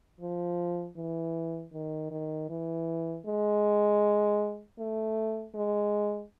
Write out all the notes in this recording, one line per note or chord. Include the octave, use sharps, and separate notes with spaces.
F3
E3
D#3
D#3
E3
G#3
A3
G#3